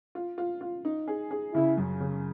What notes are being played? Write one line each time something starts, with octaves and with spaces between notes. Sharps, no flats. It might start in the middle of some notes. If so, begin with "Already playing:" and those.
F4
F4
F4
D#4
G#4
G#4
C#3 E4
F#2
C#3